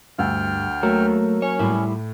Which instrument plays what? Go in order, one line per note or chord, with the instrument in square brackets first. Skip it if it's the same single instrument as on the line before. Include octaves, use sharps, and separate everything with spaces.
[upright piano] D2 F#5 E6 [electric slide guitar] G2 [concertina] G5 F6
[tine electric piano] F#3 A#3 A#4 [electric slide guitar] A3
[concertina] C#4 [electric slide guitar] C#5
[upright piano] A2 [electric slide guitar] G3 E4